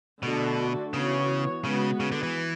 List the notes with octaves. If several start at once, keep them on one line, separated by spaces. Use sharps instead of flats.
B2 D3 A3 D4 F#4 A4
C#3 E3 B3 F#4 C#5
C#3 G#3 B3 F#4 B4
C#3
D3
E3